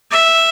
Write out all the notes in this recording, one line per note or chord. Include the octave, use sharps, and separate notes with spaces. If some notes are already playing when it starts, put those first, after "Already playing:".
E5